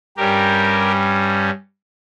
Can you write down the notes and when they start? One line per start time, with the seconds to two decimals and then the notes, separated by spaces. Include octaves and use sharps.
0.17 G2 G3 C#4 G4 A#4